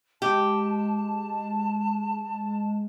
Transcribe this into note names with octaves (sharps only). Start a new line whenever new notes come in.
G#3 G4 A5